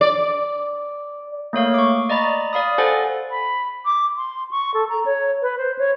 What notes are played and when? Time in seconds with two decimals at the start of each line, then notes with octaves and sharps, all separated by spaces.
0.01 D5
1.53 A3 A#3 C#5 F5
1.74 C#6 D6
2.09 D5 D#5 A#5 B5 A6
2.53 D5 F5 B5 D#6
2.78 A4 C5 F#5 G#5 A6
3.31 B5
3.86 D6
4.17 C6
4.51 C#6
4.74 A4
4.89 A#5
5.06 C#5
5.42 B4
5.58 C5
5.79 C#5